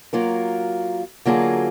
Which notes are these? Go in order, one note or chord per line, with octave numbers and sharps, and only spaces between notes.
F#3 A#3 F4 A#4
D3 F#3 A#3 F4 G#4